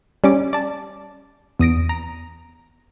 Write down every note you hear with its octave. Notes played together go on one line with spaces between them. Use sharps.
G3 C#4 D6
D5 A5
E2 D#6 A#6 D7
A#5